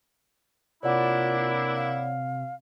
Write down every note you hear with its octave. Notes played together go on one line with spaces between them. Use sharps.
C3 A#3 D4 E4 F4 C#5 D5 F#5
F5